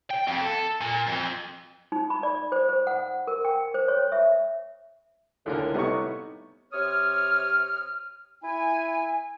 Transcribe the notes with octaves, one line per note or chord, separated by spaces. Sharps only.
G5
F2
A4
A#2
F2
D#4
B5
D5
C5
C5
F#5
A#4
G5
C5
C#5
E5
C#2 A2 D3 A#4
C3 G3 B3 D#4 C#6
C3 C#5 D#6 F6
E4 G#5